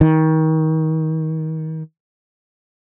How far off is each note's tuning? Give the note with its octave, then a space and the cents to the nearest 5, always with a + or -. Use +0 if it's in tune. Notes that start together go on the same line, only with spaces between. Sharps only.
D#3 +30